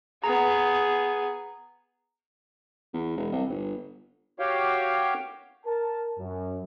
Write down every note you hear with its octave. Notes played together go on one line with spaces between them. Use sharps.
B3 G#4 A#5
E2
E1
C2
G1
F#4 G4 C#5 F5 G5
A#4 A5
F#2